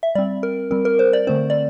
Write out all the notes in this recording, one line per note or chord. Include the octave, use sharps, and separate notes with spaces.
E5
G3 C4 D5
A#4
G3 C4 A#4
A#4
C5
D5
D3 A3 C4 C5
D5